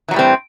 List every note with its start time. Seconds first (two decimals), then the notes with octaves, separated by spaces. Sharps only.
0.08 E3
0.11 F#3
0.14 A2
0.16 G3
0.19 C4